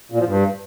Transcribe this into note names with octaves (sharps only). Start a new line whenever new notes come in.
A#2
F3
G2